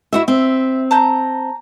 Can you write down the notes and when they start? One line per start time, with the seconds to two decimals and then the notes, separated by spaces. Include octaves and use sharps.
0.13 E4 F#4 E5
0.28 C4 E5
0.91 A5 A#5 G6